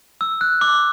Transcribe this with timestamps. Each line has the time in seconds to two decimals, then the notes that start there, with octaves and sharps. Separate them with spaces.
0.21 E6
0.41 F#6
0.61 D6